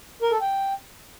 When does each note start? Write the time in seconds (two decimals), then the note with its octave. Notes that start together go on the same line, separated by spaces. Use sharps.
0.22 A#4
0.32 A4
0.41 G5